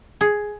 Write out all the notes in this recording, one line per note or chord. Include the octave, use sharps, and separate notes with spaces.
G#4